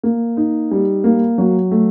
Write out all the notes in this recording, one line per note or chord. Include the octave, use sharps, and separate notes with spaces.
A#3
D#4
G3
A#3
F#3
A3